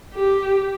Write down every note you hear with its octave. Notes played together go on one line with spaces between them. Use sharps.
G4